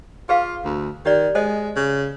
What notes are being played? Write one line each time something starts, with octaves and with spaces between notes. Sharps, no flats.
F4 G#4 B4 F5
D2
D#3 G4 D5
G#3 A4 C5 D#5
C#3